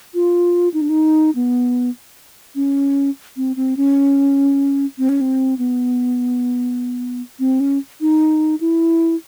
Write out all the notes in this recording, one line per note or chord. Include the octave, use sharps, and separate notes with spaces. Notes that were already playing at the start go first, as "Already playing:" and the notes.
F4
D#4
D4
D#4
B3
C#4
C4
C4
C#4
C4
C#4
C4
B3
C4
C#4
D#4
E4